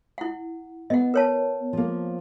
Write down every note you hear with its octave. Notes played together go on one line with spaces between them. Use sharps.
E4 F#5
B3 D#5 F#5
A#4 C#5 A5
F3 A#3